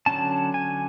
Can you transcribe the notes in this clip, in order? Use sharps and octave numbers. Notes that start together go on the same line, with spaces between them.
D3 F#3 C#4 A5
G#5